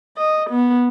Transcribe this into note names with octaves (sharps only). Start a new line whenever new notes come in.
D#5
B3